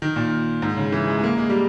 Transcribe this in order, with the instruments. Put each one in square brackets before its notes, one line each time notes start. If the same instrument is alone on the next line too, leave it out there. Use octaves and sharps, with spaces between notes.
[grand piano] D#3
A#2
G#2
C#3
E3
G#3
G#3
A#3
G#3
G3